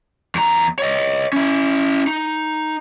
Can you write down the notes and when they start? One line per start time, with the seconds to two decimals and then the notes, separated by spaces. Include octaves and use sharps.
0.35 E2 A#5
0.79 C#5 D#5
1.33 C#4 E4
2.07 D#4